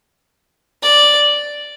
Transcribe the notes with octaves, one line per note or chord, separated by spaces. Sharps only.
D5